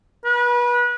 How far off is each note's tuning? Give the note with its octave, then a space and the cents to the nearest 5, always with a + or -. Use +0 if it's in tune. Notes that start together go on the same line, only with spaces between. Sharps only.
B4 -30